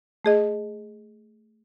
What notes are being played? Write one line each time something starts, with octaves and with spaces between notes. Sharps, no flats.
A3 G#4 D#5